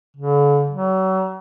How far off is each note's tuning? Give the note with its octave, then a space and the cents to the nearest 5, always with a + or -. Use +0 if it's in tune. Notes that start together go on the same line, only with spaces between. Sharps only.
D3 -45
F#3 +35